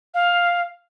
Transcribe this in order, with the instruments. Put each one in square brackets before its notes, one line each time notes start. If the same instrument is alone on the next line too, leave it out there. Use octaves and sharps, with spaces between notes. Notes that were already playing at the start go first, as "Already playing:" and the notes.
[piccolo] F5